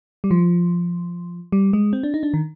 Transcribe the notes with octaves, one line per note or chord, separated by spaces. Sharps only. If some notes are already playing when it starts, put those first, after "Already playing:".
G3
F3
G3
G#3
C4
D4
D#4
D4
D#3